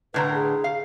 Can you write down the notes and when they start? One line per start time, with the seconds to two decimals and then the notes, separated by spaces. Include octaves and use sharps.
0.14 A2 D3 B4 A#5
0.35 G#4
0.64 F5